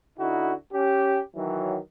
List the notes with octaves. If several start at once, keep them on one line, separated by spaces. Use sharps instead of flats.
D3 D#4 E4 F#4
C#4 G4
D#3 E3 F#3